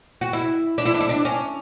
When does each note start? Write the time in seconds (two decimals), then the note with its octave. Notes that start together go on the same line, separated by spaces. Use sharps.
0.21 F#4
0.33 E4
0.78 D4
0.85 E4
0.94 D4
1.01 E4
1.09 D4
1.25 C#4